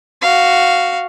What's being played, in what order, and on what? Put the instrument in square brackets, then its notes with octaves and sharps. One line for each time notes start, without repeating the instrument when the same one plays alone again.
[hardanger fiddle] F#4 F5